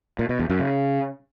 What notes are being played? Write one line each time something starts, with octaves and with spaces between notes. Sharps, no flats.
A#2
B2
E2
F#2
C#3